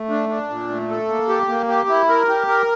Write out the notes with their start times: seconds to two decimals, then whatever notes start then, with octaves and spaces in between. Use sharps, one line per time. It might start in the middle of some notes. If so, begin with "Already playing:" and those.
Already playing: A3
0.09 D4
0.29 D4
0.50 A#2
0.69 A3
0.90 A4
1.08 A#3
1.28 G4
1.49 A#3
1.68 G4
1.89 E4
2.09 A#4
2.28 G4
2.48 A#4